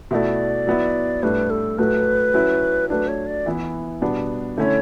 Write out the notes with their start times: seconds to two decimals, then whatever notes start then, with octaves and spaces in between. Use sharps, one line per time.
0.11 B2 A3 E4 D5 E5
0.67 F#3 B3 E4
1.23 A2 G3 D4 B4
1.50 A4
1.78 A2 F#3 A3 B4
2.34 F#3 C#4 E4
2.90 F#3 A3 D4 B4
3.08 C#5
3.27 D5
3.46 E3 B3 E4
4.01 B2 G3 B3 D4
4.57 D3 A3 C#4 E4 C#5